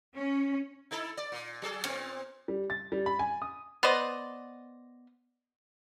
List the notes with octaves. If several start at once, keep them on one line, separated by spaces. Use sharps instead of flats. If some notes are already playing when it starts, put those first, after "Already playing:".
C#4
D#4 E4 A4
D5
A#2
F#3 G#4 A4
A#2 B3 C4
G3
A6
G3
B5
G#5
D#6
B3 C5 D5 D#5